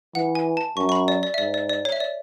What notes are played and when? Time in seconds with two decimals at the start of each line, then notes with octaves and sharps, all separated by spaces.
0.15 E3 F#5
0.35 G#5
0.57 A5
0.77 F#2 C#6
0.89 C#6
0.92 B5
1.08 D5
1.23 D5
1.34 E5
1.38 G#2 D5
1.54 D5
1.69 D5
1.85 C#5
1.92 E5
2.00 D5